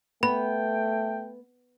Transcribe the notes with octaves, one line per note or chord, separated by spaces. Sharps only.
A3 B3 G5 B5